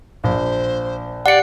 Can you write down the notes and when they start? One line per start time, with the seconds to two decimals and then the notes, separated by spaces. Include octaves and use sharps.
0.24 A#1 C5
1.26 G4 D5 F#5 C#7